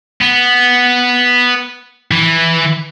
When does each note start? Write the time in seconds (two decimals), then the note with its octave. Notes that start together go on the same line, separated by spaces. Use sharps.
0.21 B3
2.11 E3